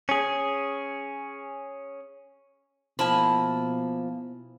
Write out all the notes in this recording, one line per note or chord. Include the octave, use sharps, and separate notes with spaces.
C#4 G#4
B2 F3 A#3 E4 G#5 A5 B5